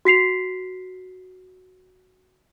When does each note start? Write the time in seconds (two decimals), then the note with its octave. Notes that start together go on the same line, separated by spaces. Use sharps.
0.05 F#4 B6 C7 F7